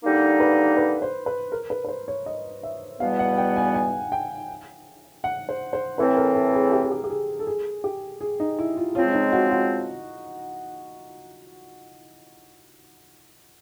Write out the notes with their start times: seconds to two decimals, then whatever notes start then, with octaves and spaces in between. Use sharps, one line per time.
0.03 D3 G3 A#3 D#4
0.40 B4
0.77 B4
1.02 C5
1.26 B4
1.52 A#4
1.70 B4
1.85 B4
1.89 C5
2.08 C#5
2.26 D#5
2.63 E5
3.00 E2 B2 G3 B3 F5
3.19 F#5
3.37 G5
3.56 G#5
3.75 G#5
4.12 G5
5.24 F#5
5.49 C5
5.73 C5
5.98 A2 E3 A3 C4 B4
6.17 A#4
6.35 A4
6.54 G#4
6.72 G4
6.82 G#4
6.92 G4
7.04 G4
7.10 G#4
7.39 A4
7.47 G#4
7.84 G4
8.21 G#4
8.40 D#4
8.59 E4
8.77 F4
8.95 C#3 F3 G#3 C4 F4
9.14 D#4
9.32 F#4
9.51 F#4